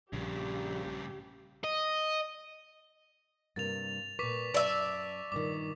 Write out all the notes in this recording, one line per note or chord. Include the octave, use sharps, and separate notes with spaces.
A#1 G2 C#3 G4
D#5
G2 C3 A#3 A6 F7
A#2 B4 C#6 D6 B6
F#2 D5 E5 A5
G2 A#2 D#3 D6